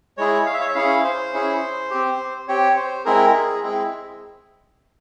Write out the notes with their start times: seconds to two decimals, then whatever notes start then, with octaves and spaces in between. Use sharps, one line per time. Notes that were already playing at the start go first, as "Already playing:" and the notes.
0.18 G#3 E4 G#4 C#5
0.47 F5
0.54 E5
0.61 C#5
0.68 E5
0.75 C#4 E4 G#4 F5
1.04 C5
1.33 C#4 E4 G#4
1.91 C4 G4
2.48 C4 G4 C#5
2.76 C5
3.05 G#3 C4 E4 G#4 A#4
3.34 G#4
3.63 G#3 C4 E4 G#4